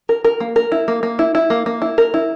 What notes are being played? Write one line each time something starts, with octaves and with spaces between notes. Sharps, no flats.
A#4
A#4
A#3
A#4
E4
A#3
A#3
E4
E4
A#3
A#3
E4
A#4
E4